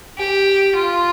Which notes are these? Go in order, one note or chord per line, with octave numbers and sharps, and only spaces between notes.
G4
F4